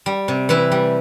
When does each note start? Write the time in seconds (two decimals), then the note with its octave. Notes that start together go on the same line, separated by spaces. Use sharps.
0.06 G3
0.28 C3
0.49 C3 E3 E4
0.72 G3